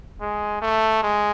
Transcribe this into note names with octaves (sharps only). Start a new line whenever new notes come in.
G#3
A3
G#3